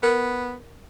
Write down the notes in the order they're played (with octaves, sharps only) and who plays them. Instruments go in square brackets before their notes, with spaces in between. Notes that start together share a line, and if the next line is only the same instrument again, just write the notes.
[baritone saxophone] B3 [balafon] A#4